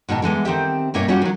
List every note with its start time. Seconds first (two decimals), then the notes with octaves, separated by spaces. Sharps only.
0.09 G#2 B2 D#3 D#4 A5
0.22 D3 E3 G#3 B3
0.45 D#3 C4 G4 E5
0.94 G2 B2 A#3 C#4 E4 C#5
1.08 G3 C#4 F4 F#4
1.22 D#3 F#3